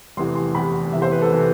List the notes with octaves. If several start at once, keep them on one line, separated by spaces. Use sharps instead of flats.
F1 E2 C3 E3 C6
C6
F1 E2 C3 E3 B5
F1 E2 C3 E3 E5
C5
B4
A4
C3 E3